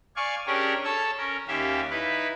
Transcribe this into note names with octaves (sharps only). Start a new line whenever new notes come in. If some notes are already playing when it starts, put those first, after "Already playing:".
D5 F5 G#5 C#6
C#4 D4 G4 G#4 A#4 C#5
A4 C#5 A5 E6
C#4 A#4
D#2 C#4 G4 E5 F5
D#4 E4 B4